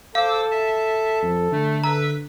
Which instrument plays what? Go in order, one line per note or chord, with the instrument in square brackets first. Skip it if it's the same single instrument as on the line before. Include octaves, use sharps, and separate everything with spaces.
[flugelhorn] A4 [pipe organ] C5 D6 E6 [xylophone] F5
[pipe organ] E5 A5
[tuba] F2
[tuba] D3 [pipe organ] A3
[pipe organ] B4 E5 E6 [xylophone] A#5